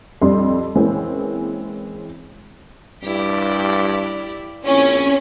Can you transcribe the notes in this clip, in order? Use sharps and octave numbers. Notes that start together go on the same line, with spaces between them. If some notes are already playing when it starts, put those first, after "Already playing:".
F2 G3 D4 C6
E3 G#3 A#3 C4 C#4
G2 E4 G4 D5
A#1 C4 C#4 E4